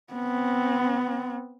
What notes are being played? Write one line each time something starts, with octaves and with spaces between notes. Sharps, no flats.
B3 C4